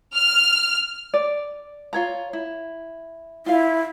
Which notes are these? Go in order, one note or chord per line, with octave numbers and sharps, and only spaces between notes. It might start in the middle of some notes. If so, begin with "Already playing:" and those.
F6
D5
F4 C#5 A#5
E4
E4 F4 F5